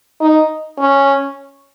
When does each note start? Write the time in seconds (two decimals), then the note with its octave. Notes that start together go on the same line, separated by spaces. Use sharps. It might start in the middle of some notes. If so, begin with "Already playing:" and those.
0.21 D#4
0.79 C#4